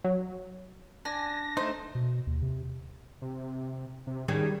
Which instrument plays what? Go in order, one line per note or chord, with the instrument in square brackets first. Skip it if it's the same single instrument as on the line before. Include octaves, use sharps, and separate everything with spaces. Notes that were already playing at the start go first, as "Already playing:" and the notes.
[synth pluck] F#3
[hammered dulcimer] D4 [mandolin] G#5 [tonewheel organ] A#6
[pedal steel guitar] A3 D#4 [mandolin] C5
[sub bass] B2
D#2
C3
[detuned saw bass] C3
C3
[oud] D#3 C#4 G#4 [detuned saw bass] G3